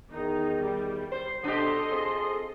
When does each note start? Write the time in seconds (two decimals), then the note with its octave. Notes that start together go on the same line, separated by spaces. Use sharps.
0.12 E2 D#3 D#4
0.62 G3
1.12 C5
1.44 B2 D4 G4 A4 D#5 F#5 C6
1.91 C4 F4 G#4